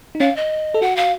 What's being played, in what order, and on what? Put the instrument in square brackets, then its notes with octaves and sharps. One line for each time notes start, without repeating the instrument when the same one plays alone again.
[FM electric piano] D#4
[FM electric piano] C#4 [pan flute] F5
[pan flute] D#5
[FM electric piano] A4
[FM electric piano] F#4 [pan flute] F#5
[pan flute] F5